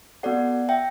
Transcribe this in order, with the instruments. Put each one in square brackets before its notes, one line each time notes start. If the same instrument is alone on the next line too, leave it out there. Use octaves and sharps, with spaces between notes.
[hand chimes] B3 F#4 A4 D5 F#5
E5 G5